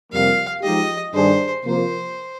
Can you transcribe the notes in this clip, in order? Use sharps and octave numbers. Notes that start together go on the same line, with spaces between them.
F2 C3 G3 A#3 F5
F3 G#3 D#4 G4 D#5
G2 D#3 G3 D4 G#4 C5
C3 F3 A#3 C5